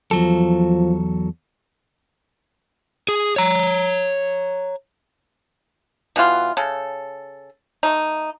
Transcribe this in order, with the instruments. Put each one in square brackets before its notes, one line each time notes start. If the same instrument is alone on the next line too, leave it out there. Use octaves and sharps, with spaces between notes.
[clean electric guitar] E2 F#3 A4 [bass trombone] F3
[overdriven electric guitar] G#4
C#5 A#5
[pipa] B2 E3 G3 F4
C#3 A4
A3 D#4